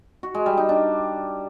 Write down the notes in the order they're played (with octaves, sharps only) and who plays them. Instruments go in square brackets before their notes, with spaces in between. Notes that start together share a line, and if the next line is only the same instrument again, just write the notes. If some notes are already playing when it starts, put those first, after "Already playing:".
[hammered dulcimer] F#4
G#3
G3
D#4
D4